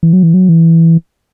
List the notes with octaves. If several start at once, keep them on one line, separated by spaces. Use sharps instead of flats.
E3
F#3
E3
F#3
E3